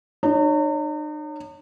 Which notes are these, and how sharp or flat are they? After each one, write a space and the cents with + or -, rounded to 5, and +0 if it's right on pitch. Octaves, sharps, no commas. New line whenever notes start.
D#4 -45 C#5 +0